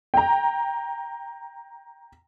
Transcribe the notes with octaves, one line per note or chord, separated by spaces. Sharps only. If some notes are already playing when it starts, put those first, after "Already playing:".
G5 A#5